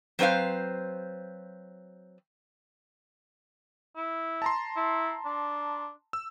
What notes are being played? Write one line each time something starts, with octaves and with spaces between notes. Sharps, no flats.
F#3 C4 B4 C5 F5
E4
A5 A#5 C6
E4
D4
E6